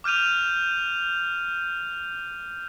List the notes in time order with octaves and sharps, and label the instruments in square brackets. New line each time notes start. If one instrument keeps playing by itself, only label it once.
[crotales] D6 F6 G6 D#7 F7